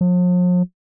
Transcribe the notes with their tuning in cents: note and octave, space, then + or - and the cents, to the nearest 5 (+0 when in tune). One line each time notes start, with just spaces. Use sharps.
F3 +45